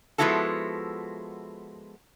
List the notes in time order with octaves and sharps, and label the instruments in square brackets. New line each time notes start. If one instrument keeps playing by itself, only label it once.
[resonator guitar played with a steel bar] F3 G#3 B3 E4 F#4 A4